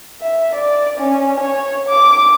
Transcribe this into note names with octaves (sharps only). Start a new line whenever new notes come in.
E5
D5
C#4
C#5
D6